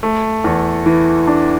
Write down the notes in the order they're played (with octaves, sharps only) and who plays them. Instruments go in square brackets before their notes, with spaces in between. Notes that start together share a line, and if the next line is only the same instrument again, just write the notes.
[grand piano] A3
E2
E3
D4